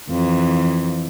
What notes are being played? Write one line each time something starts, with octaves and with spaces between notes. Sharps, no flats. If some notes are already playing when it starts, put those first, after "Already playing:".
F2 E3